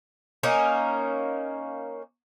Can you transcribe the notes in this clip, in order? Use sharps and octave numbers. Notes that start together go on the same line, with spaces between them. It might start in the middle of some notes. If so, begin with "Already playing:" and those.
A#3 C#4 D#4